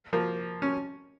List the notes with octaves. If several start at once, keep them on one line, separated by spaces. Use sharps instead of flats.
F3 A#3
C#4